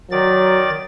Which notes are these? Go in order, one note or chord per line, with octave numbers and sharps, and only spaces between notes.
D#3 F#3 D5 A6